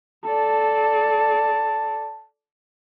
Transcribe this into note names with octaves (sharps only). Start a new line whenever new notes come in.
A4 D5 A5